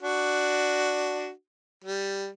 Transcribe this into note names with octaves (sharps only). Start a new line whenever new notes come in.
D4 F#4
G3